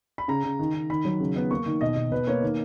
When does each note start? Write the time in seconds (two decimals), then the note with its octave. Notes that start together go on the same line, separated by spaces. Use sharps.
0.18 B5
0.28 C#3 A#5
0.44 C#3
0.59 D#3
0.74 D#3
0.90 D#3 B5
1.05 F#3
1.20 C#3
1.36 B3
1.51 A#3 C#6
1.66 D#3
1.81 B2 D#5
1.96 B2
2.11 B2 B4
2.27 A#3 C#5
2.42 D#3